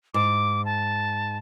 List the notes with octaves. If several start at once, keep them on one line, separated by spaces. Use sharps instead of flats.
G#2 D6
A5